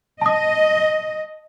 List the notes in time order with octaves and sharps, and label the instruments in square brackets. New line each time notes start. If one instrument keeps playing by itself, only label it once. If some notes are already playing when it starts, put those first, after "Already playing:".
[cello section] D#5 [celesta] A5 D#6